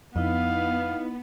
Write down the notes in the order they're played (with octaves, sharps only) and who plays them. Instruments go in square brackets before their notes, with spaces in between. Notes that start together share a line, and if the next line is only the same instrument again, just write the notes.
[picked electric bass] F2 [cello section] B3 [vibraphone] D#4 E4 D#5 [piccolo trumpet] F5